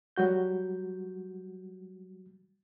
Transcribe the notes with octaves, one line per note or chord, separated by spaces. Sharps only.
F#3 G3 F#4 G6